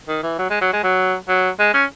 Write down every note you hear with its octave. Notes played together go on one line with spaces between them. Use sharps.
D#3
E3
F#3
G#3
F#3
G#3
F#3
F#3
G#3
C#4